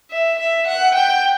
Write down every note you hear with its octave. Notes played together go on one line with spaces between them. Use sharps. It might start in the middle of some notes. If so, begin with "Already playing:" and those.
E5
E5
F#5
G5